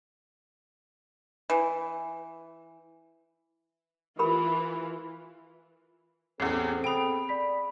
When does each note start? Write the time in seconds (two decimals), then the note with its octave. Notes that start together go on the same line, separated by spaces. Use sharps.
1.50 E3
4.19 E3 F4 G4 A#4 B5
6.40 A1 E2 C4 G#4 A4 C7
6.84 G5 B5 D#6 D7 F7
7.29 D5 B5 B6